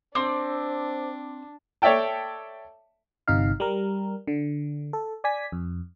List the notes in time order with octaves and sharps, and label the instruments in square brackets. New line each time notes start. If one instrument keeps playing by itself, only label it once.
[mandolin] C4 [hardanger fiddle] D4 [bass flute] C5 [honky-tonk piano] D6
[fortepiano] A4 C#5 D5 E5 G5 A5
[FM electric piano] G1 C3 D#4 F5
G3 A#4
D3
A4
D5 G#5 B6
F2